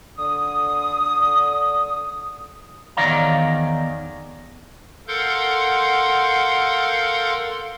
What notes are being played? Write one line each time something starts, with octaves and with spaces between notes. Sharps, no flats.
D3 D#6
E2 D#3 C#5 D5 F5 A#5
A4 A#4 F5 F#5 C6 G6